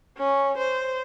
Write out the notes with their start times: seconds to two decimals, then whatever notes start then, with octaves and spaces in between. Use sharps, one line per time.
0.18 C#4
0.58 C5